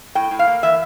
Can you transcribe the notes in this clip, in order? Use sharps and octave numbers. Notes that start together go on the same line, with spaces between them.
A2 G5
A2
F5
A#3
E3 E5